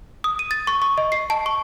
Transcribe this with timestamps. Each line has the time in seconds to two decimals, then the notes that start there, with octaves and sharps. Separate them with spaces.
0.24 D#6
0.39 D#7
0.51 A6
0.67 C#6
0.82 C#6
0.98 D#5
1.12 C7
1.30 A5
1.46 C#6